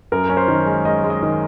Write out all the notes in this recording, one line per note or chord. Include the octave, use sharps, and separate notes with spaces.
F#2 A#4
C#4
C5
D#3
G#3
G#3 D#5
G#3
D#5
D#3